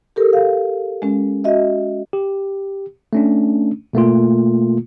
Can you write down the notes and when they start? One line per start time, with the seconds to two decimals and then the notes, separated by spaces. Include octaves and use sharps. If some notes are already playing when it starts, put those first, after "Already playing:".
0.16 G4 A4 A#4
0.33 F5
1.02 G#3 C#4
1.44 F#4 D#5 E5
2.13 G4
3.13 A3 C#4 D4
3.93 B2 A3 A#3 F4